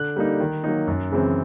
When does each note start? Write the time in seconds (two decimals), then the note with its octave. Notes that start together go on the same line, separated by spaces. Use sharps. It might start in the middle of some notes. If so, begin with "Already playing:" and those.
Already playing: D3 F#6
0.16 G3 A#3 D#4
0.40 D#3
0.64 F#3 A#3 D#4
0.87 F#2
1.11 C#3 E3 G#3 C4